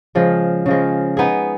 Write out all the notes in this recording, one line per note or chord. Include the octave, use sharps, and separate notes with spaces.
C#3 F3 G#3
C#3 F3 G#3
B3 D#4 G#4